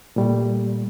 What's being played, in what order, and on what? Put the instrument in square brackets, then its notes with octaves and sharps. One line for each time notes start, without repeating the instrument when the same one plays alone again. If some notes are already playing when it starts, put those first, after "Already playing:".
[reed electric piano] A#2 G3 A3